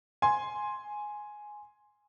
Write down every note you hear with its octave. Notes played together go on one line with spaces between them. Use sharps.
G#5 C6